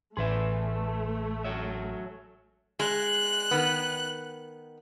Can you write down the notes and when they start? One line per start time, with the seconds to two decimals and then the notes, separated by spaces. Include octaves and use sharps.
0.17 A1 A3 G#4 B4 E5 C6
1.44 F#3 C#5 E5
2.80 G#3 F#6
3.51 D#3 B3